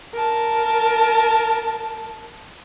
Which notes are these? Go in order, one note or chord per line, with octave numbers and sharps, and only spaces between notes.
A#4 A5